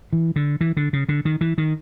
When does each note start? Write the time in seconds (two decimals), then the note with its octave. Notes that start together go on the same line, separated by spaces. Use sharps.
0.13 E3
0.36 D3
0.61 E3
0.77 D3
0.93 C#3
1.09 D3
1.25 D#3
1.41 E3
1.58 D#3